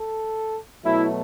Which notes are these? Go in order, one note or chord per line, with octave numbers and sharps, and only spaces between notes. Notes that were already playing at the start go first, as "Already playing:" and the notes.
Already playing: A4
B2 F#3 A3 E4